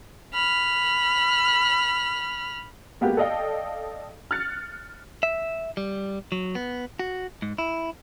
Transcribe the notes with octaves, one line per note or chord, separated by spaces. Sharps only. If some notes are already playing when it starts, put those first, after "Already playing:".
B5 F6
G#3 A#3 B3 F#4 G4
A4 D5 D#5 F5 G5
F6 F#6 A6 C#7
E5
G3
F#3
B3
F#4
G#2
E4